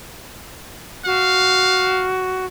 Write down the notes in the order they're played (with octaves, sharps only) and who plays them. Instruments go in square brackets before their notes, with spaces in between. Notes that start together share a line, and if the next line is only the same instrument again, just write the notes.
[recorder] F#4 [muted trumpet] F5